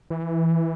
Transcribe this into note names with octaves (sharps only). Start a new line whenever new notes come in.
E3